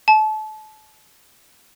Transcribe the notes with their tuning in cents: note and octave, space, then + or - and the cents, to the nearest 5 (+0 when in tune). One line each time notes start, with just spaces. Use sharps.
A5 -30